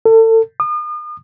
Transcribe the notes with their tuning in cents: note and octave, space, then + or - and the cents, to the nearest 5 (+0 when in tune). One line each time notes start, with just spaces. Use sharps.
A4 +35
D#6 -40